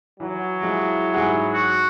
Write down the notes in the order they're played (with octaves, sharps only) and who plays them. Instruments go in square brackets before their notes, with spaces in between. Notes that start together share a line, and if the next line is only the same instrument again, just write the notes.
[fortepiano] E3 [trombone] F#3
[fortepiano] F3 G#3 [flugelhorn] E4
[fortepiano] G#2 G#4 F#5
[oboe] F#4